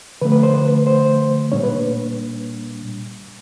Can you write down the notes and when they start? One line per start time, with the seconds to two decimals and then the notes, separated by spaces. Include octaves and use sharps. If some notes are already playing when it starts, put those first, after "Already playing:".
0.22 D3 F3 A3 B4
0.32 B4
0.43 C5
0.54 B4
0.87 C5
1.52 A#2 G3 A#3 D4 C#5
1.63 B4